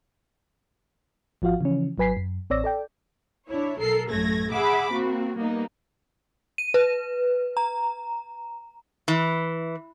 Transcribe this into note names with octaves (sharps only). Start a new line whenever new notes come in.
G#1 F3 F4 F#4 F5
C#3 E3 F3 C#4
G#1 F#3 B4 G#5 B6 C7
F#2
A1 C4 C#5 D5 E6 A#6
A4 D5 G5
D4 E4 C#5
B1 A4 A#4 C7
A1 F#2 A3 G#6 A#6
G#4 E5 F#5 B5 D6
A#3 C4 F#4
G3 A#3 B3 D#4
D#7
B4
A#5
E3